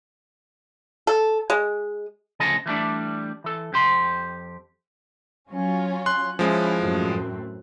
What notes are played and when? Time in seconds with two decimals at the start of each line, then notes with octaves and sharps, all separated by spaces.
1.07 A4
1.50 G#3
2.40 D2 C#3 F3 A4 D#5 G#5
2.66 E3 G3 A3 D4
3.44 E3 A4
3.73 F2 G4 C6
5.50 F#3 C#4 F4
6.06 C6 F#6
6.39 F3 G#3 C#4 E4
6.79 F#2 A2 C4